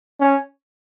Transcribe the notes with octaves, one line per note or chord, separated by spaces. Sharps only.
C#4